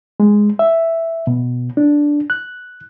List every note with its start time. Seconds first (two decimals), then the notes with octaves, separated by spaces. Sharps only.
0.20 G#3
0.59 E5
1.27 B2
1.77 D4
2.30 F#6